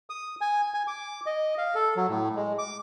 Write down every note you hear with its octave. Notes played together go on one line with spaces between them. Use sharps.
D#6
G#5
G#5
D6
D#5
F5
A4
F#3
A2
G#3
D6